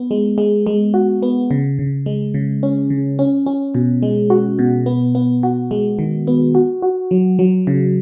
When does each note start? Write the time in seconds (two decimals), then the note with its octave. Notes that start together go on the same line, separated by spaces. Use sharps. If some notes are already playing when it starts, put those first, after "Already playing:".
Already playing: B3
0.11 G#3
0.38 G#3
0.67 G#3
0.94 F#4
1.23 B3
1.51 C#3
1.79 C#3
2.06 G#3
2.34 C#3
2.63 C#4
2.90 C#3
3.19 C#4
3.46 C#4
3.75 B2
4.02 G#3
4.30 F#4
4.59 B2
4.86 B3
5.15 B3
5.43 F#4
5.71 G#3
5.99 D#3
6.27 B3
6.55 F#4
6.82 F#4
7.11 F#3
7.39 F#3
7.67 C#3